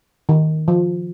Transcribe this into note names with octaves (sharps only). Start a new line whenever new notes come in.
D#3
F3